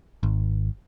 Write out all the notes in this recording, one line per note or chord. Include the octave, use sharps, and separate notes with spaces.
G#1